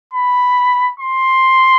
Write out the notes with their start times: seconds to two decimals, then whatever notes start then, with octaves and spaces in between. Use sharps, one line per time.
0.13 B5
1.00 C6